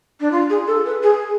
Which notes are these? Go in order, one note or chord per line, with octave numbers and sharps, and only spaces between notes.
D4
F4
G#4
A4
B4
G#4